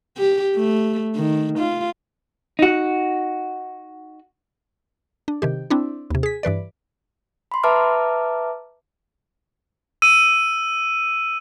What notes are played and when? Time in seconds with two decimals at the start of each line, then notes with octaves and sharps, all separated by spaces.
0.17 G4
0.56 A3
1.15 D#3
1.58 F4
2.59 D#4 F#4
5.28 D4
5.42 C3 D#3 G4
5.70 C4 D4 E4
6.10 D#2 C3
6.23 G#4 B6
6.43 G2 E3 B4 D5
7.52 B5 C6
7.63 B4 E5 A5 A#5 D6 F6
10.02 E6 D#7